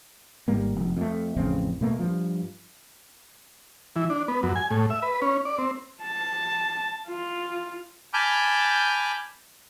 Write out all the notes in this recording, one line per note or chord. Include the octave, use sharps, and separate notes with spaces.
G#1 G#2 G3 A#3
F1 F2
F2 A3
A1 F2 C#3 C4
B2 A3 A#3
G2 F3
E3
D4
B3
F#2
G#5
A2
E5
B4
C#4
D5
C4
A5
F4
G#5 A5 B5 D6 F6 G6